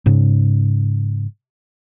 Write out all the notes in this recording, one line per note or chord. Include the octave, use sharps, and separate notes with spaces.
G#2 C#3